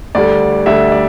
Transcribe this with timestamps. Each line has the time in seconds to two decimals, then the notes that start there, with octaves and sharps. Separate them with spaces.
0.15 D2 D3 G3 D5
0.66 D2 D3 G3 E5
0.92 D5